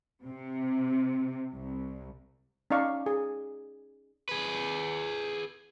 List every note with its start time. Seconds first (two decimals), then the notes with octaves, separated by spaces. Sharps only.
0.22 C3
1.54 C2
2.70 C#4 D#4 D5 F5 C#6
3.06 G#4
4.29 G#4 B4